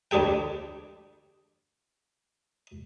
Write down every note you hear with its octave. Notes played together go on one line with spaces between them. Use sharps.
D2 D4 G4 G#4 G5